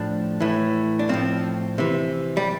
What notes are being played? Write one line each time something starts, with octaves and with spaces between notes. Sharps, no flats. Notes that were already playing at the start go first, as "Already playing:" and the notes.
Already playing: A2 F3 D4
A2 E3
D4
A2 F3 C4
C3 E3
G3